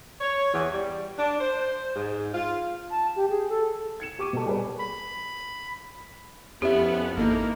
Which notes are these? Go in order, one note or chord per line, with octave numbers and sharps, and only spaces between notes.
C#5
E2
G3
D4
C5
G#2
F4
A5
G4
G#4
A4
G#6 C#7 E7
G4 C#6 D6 D7 D#7
B2 A4
G3 G#4 B4
B5
F2 B3 C#4 E4 G4 E5
G#1 A#3 D#4 E4 A4